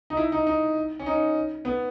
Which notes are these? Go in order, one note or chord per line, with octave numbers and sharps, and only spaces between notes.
D#4
E4
D#4
D#4
C#4
D#4
B3